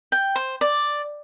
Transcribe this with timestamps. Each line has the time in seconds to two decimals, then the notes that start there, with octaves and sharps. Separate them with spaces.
0.12 G5
0.36 C5
0.61 D5